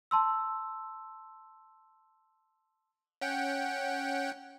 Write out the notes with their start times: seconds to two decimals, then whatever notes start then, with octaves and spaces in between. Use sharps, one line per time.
0.11 A5 C6 E6
3.21 C#4 F#5 G5